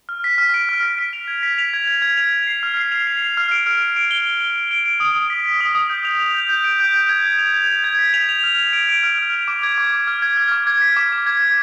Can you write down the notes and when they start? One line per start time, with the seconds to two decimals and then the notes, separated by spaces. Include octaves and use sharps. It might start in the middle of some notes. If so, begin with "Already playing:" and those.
0.09 F6
0.24 B6
0.38 F6
0.54 D7
0.69 F6
0.83 B6
0.99 D7
1.13 F7
1.28 G#6
1.43 B6
1.58 F7
1.73 G#6
1.87 G#6
2.02 G#6
2.17 F7
2.32 F7
2.47 C7
2.63 F6
2.77 C7
2.92 F7
3.07 C7
3.22 C7
3.37 F6
3.51 D7
3.67 F6
3.81 D7
3.96 D7
4.11 G7
4.26 G7
4.41 G7
4.56 G7
4.71 D7
4.86 D7
5.00 D#6
5.16 D#6
5.30 B6
5.46 B6
5.61 D#6
5.75 D#6
5.90 G6
6.05 F7
6.20 F7
6.34 G6
6.49 G6
6.64 D7
6.80 G6
6.94 G6
7.09 G#6
7.24 G#6
7.39 F7
7.54 G#6
7.70 G#6
7.84 G#6
7.99 B6
8.14 F7
8.29 F7
8.44 F6
8.59 F7
8.73 D7
8.89 D7
9.03 F6
9.18 F6
9.33 F7
9.48 D6
9.63 G#6
9.78 D6
9.93 D6
10.07 F6
10.22 G#6
10.37 F6
10.52 D6
10.67 G#6
10.82 B6
10.97 D6
11.12 D6
11.26 G#6
11.41 G#6